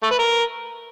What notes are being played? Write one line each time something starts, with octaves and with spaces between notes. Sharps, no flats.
A3
B4
A#4